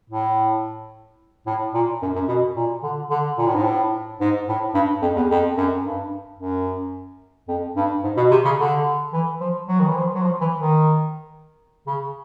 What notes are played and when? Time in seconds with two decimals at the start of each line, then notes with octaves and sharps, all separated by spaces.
0.10 A2
1.46 A2
1.74 A#2
2.02 F#2
2.15 F#2
2.28 B2
2.56 A#2
2.83 D3
3.10 D3
3.38 A#2
3.47 A2
3.55 G#2
3.64 A2
4.20 G#2
4.48 A2
4.74 G2
5.02 F2
5.16 E2
5.30 F2
5.57 F#2
5.84 G2
6.39 F#2
7.48 F2
7.76 G2
8.04 G#2
8.17 B2
8.31 C3
8.45 C#3
8.58 D3
9.13 E3
9.40 F3
9.68 F#3
9.79 D#3
9.87 E3
9.95 F3
10.14 F#3
10.22 F3
10.41 E3
10.59 D#3
11.87 C#3